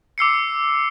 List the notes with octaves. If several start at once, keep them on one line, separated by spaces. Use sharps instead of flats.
D6 E6 C7 C#7